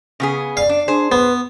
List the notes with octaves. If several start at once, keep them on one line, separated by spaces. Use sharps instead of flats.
C#3 B3 G#4
D5 F5
D4
D4 G#4 C5
B3 B4